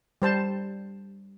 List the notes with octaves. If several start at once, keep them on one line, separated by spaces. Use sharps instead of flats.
G3 C5 A5